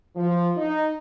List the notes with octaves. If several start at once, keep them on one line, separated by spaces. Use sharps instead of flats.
F3
D#4